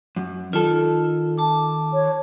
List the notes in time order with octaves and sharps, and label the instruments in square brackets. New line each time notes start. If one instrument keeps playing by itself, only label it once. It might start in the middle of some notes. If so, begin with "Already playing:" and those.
[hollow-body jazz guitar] F#2
[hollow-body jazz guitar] D#3 A4 [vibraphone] F4
[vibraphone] A5 D6
[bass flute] C#5